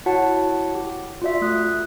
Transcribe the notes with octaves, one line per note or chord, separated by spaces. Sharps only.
E4 F#4 C#5 F#5 A5
G4
F4 F#4 D5 E5
A3 D#6 F#6